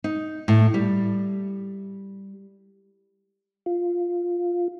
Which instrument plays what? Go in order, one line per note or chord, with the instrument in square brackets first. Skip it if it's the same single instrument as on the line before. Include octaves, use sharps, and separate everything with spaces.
[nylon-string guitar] D#4
A2
G3
[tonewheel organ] F4